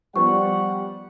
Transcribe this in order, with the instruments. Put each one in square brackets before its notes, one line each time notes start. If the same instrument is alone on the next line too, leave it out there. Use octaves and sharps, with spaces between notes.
[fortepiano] F3 B3 [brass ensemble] G3 F#5 [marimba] C#6